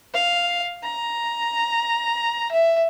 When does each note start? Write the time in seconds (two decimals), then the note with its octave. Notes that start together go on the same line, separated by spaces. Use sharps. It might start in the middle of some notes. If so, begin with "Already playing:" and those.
0.14 F5
0.83 A#5
2.51 E5